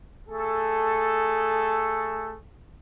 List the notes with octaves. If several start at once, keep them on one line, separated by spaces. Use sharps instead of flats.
A3 G#4 A4